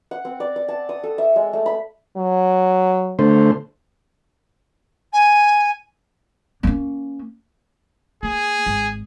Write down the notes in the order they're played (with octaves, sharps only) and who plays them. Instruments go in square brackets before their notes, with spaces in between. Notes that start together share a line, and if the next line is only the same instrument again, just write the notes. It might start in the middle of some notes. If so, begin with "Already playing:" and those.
[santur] F#5
C4
D5
D5
A5
D#6
A4
E5
G#3
A3
B5
[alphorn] F#3
[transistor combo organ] D3 A3 C5
[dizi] G#5
[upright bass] A#3 C#4
[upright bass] A#3 [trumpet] G#4
[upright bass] G#1